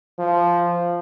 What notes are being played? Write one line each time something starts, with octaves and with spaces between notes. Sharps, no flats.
F3